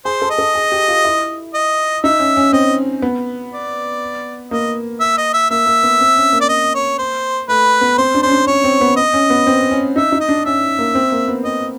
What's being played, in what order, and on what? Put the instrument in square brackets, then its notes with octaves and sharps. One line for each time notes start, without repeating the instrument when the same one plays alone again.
[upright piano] G#4 [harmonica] C5
[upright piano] A4
[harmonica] D#5
[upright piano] A4
G#4
G4
F4
E4
[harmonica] D#5
[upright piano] D#4 [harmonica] E5
[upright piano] C#4
C#4
[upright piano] C4 [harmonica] D#5
[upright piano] B3
[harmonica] D5
[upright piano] A#3 [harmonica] D#5
[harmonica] E5
D#5
E5
[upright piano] A#3 [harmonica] E5
[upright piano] A#3
B3
C4
C#4
A#3
[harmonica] D5
D#5
C#5
C5
[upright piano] A3 [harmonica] B4
[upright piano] B3
[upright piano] C4 [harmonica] C5
[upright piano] D4
[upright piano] C#4 [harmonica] C5
[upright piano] D4
[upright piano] C#4 [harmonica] C#5
[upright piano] C4
B3
[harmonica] D#5
[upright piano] C#4
B3
C4
C#4
[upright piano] D#4 [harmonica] E5
[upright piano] D#4
[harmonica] D#5
[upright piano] D4
[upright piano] C#4 [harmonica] E5
[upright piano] A#3
C4
A#3
B3
[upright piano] C4 [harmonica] D#5